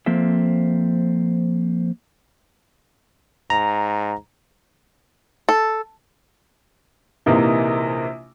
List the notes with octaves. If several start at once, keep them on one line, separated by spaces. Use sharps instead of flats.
F3 A#3 C4 A4 E5
G#2 A#5
A4
A#1 C3 E3 A#3 D#4